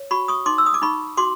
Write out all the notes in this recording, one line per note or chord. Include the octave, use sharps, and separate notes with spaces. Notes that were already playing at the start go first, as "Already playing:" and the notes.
Already playing: C#5
F#4 B5 C#6
C#6 D#6
D#4 C6 D6
E6
D#6
D6
D#4 B5 C#6
F#4 C6 D6